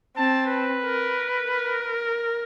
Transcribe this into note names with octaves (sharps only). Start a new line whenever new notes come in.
C4 A5
B4
A#4
A#4